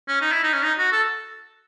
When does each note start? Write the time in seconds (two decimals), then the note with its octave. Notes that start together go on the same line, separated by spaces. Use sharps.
0.08 C#4
0.21 D#4
0.32 E4
0.43 D#4
0.53 C#4
0.63 D#4
0.78 F#4
0.92 A4